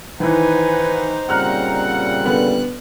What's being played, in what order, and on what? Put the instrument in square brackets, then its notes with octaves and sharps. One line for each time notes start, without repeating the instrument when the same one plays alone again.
[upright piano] D#3 E3 [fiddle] D#4 C5 [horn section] B4 F#5 G#5
[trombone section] A#2 C#3 G3 [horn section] C4 F#5 [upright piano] A#5 F6 F#6
[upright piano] D3 B3 [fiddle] F#6